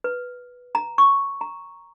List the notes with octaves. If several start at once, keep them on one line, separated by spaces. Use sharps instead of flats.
B4
A#5
C#6
A#5